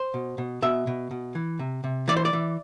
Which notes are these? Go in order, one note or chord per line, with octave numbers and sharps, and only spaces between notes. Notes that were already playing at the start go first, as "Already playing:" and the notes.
Already playing: C5
B2
B2
B2 E5
B2
B2
E3
C3
C3
E3 D5
C5
D5
E3